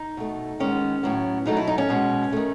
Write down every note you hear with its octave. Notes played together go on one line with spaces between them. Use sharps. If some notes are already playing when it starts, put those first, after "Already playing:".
Already playing: D#4
B2 A3
D#3 G#3 B3 C#4
A2 F#3 B3
B2 F#3 A3 D#4
E4
D#4
C#4
B2 G#3 B3
D#3 A3